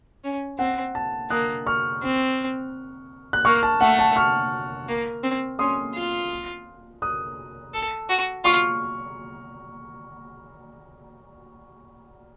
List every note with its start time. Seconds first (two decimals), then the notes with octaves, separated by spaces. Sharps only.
0.24 C#4
0.59 C4 F#5
0.95 A5
1.30 A#3 D#6 F#6
1.66 C#6 F6
2.03 C4
3.33 F#6
3.45 A#3 C#6 F6
3.63 A5
3.81 A3 F#5
3.99 A5
4.16 C#6 F6
4.88 A#3
5.23 C4
5.59 C#4 C6 D#6
5.95 F4
7.02 D#6 F#6
7.74 A4
8.10 F#4
8.44 F4 C#6 F6